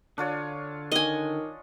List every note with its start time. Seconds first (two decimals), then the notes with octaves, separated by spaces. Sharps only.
0.18 D3 D4 F4 C#5
0.92 D#3 D#5 G#5